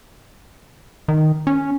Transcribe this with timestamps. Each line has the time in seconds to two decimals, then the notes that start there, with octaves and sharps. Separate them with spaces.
1.08 D#3
1.47 C#4